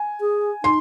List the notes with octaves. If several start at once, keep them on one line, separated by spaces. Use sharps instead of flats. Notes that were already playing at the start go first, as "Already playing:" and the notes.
Already playing: G#5
G#4
D#4 C6